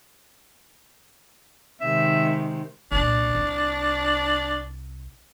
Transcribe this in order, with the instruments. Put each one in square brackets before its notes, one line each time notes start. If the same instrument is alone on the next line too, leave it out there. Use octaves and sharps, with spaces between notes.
[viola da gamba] C3 D#3 G#3 [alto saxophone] E5
[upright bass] C2 A#2 [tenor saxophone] D4
[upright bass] C2